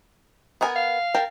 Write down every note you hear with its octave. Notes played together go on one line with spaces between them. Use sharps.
B3 A#4 G#5
F5
A#4 G5 A5